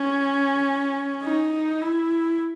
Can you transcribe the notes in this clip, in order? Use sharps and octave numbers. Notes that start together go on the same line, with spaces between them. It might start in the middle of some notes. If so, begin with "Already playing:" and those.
Already playing: C#4
D#4
E4